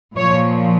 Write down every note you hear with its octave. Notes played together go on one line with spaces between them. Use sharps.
A#2 F3 C#5